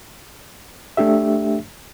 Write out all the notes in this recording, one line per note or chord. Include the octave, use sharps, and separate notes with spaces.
A3 D4 G4 E5